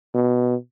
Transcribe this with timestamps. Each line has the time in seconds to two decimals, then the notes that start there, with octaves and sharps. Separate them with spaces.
0.14 B2